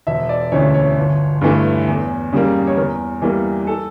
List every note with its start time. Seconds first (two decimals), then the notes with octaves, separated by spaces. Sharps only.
0.07 E1 E5
0.29 D5
0.52 D2 C#3 E3 C#5
0.74 C#5
0.97 G1
1.41 G2 E3 A3
1.88 E2
2.33 C#3 G3 A#3
2.67 C#5
2.77 E2 A#4
3.22 E3 G3 A#3
3.67 A4